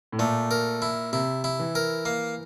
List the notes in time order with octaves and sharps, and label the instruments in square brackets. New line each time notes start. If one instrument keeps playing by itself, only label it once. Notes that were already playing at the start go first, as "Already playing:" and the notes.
[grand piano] A2
[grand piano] A#2 [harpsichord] A3
[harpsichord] A#4
E4
[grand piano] C3 [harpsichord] E4
[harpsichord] E4
[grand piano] E3
[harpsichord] A#4
A#3